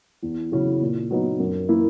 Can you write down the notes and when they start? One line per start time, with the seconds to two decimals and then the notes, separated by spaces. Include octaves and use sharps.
0.23 E2
0.52 C#3 F#3 C#4 E4
0.81 A#2
1.11 F#3 B3 D#4
1.40 F#2
1.69 E3 A#3 E4